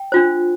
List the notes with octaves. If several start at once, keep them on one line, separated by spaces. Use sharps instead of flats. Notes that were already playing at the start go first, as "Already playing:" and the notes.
Already playing: G5
D4 F4 C5